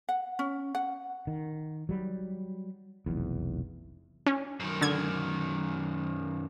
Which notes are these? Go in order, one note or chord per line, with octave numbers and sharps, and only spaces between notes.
F#5
C#4
F#5
D#3
F#3 G3
F1 B1 E2
C#4
F#2 D#3
D3 G#6